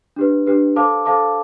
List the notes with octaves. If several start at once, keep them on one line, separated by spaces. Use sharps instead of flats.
D4 G4 B4
D4 G4 B4
A4 C5 F5 A5 D6
A4 C5 F5 A5 D6